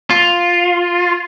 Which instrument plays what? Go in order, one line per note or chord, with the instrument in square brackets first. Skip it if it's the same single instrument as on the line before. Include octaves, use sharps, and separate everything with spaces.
[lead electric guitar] F4